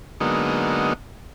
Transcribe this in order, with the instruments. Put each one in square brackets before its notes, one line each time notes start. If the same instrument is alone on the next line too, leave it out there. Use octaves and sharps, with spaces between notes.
[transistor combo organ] D3 F#3 G#3 A#3 B3 D#4